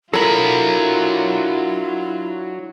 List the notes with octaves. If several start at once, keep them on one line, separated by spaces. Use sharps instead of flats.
F#3 D4 E4 F4 A4 A#4 B5